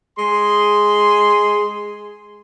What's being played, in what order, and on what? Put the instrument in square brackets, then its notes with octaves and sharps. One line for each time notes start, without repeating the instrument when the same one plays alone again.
[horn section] G#3 G#4 C6